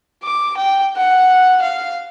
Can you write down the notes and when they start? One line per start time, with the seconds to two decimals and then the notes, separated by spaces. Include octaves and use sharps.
0.24 D6
0.57 G5
0.97 F#5
1.62 F5